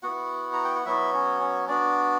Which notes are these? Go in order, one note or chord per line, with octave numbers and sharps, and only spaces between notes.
B3 E4 F#4 F#5
A#5
G5
F#5
F#3 B3 E4 F#4 E5
C#4 C#5
C#4 C#5
B3 D4 F#4 D5